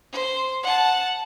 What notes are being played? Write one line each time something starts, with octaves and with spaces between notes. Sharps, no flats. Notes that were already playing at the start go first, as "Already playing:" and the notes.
C5
F#5 A5